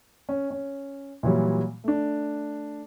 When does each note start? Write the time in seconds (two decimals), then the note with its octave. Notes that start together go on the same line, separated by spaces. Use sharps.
0.29 C#4
0.51 C#4
1.23 A#2 E3 F#3 G3
1.84 A3 D4